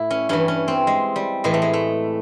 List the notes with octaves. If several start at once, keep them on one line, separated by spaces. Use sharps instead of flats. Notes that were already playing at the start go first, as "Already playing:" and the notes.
Already playing: A2 E4
C#4
G2 E3 C#4
C#4
C4
G#3
G3
A2 E3 G#3
A3
G#3
A3